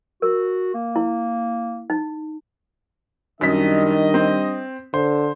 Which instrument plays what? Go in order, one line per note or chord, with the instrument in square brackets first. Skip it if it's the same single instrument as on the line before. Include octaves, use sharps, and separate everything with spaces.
[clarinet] F#4 [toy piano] A#4
[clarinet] A#3
[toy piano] E4
D#4
[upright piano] F#2 B6 [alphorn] D#3 [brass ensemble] G3 D4 D#5
[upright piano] C4
[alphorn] D3 [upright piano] C5